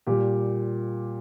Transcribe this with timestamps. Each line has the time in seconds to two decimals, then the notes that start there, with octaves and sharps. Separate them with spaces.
0.07 A#2 G3 G4